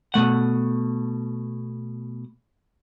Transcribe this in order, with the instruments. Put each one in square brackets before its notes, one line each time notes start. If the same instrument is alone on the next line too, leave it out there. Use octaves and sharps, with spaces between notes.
[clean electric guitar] B2 A3 F#5